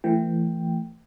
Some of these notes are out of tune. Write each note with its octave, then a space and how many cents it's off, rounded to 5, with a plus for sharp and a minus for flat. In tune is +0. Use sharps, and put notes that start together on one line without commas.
E3 +30 A3 +25 G5 +0